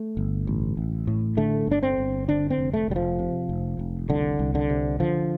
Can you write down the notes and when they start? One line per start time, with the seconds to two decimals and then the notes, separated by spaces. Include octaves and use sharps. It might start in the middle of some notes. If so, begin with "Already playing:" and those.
Already playing: A3
0.17 G1
0.47 A1
0.77 A1
1.07 A2
1.37 D3 A3
1.67 G1 D4
1.83 C4
1.98 G1
2.28 D3 D4
2.50 C4
2.58 F1
2.74 A3
2.88 F1 G3
2.96 F3
3.19 C3
3.49 F1
3.79 F1
4.09 C2 D3
4.39 C2
4.55 D3
4.70 C3
5.00 D3 F3